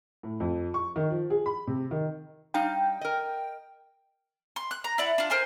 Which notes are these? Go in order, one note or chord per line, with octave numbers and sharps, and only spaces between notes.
A2
F2
C#6
D#3
F3
G#4
B5
C3
D#3
G3 D#4 F5 G5
A#4 D#5
C6
F#6
A#5
E4 D5 F#5
D4 F4
A#4 C5 G#5